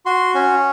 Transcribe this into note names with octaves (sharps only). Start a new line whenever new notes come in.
F#4 C6
C#4